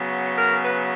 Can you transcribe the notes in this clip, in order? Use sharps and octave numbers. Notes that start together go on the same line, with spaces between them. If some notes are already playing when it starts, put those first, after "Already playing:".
Already playing: C#3 F#3 B3
A#4
B4